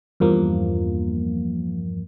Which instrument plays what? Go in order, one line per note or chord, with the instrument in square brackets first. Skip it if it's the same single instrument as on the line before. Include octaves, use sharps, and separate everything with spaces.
[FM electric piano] E2 G2 F3 A#3